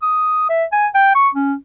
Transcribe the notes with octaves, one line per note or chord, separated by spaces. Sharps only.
D#6
E5
G#5
G5
C#6
C#4